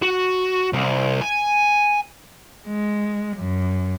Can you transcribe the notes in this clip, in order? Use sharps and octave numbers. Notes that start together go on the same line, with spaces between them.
F#4
C2
G#5
G#3
F#2